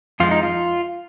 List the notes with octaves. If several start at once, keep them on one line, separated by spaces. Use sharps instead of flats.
F2 F3 G#3 F4
D#4
F4